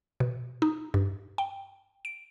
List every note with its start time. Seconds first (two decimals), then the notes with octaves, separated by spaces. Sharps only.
0.20 B2
0.62 D#4
0.94 G2
1.38 G5
2.05 D7